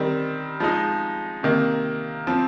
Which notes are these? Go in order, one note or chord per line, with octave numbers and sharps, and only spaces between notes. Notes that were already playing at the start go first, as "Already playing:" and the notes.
Already playing: D#3 G3 C4
F3 G#3 D#4
C3 D#3 A#3
F3 C4